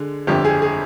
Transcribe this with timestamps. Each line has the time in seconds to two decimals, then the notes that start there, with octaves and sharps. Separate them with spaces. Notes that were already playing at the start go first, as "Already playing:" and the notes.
Already playing: D3 G#3
0.27 G1 F2 D3 G4
0.45 G#4
0.62 G#4